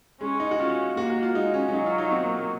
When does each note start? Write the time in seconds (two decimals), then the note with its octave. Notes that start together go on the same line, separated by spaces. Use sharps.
0.21 G#3 C#4
0.40 D#4
0.51 F#4
0.59 C#4 F4
0.97 A#3 F#4
1.10 F#4
1.23 F4
1.35 G#3 D#4
1.54 C#4
1.68 C#4
1.73 F#3 D#4
1.86 F4
1.98 D#4
2.12 C4
2.24 A#3
2.37 A#3